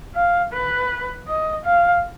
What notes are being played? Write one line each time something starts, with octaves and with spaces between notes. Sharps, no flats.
F5
B4
D#5
F5